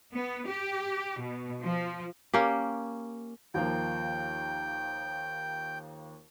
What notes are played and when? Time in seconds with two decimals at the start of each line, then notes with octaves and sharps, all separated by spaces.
0.15 B3
0.49 G4
1.20 B2
1.61 F3
2.33 A#3 C#4 G4
3.54 D#2 F3 A#3 G5